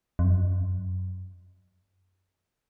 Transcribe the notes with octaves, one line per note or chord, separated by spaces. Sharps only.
F2
F#2